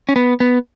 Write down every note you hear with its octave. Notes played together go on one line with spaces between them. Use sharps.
C#4
B3
B3